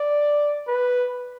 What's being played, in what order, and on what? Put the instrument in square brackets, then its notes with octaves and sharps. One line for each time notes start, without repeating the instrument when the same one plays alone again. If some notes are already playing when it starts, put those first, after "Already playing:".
Already playing: [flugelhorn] D5
B4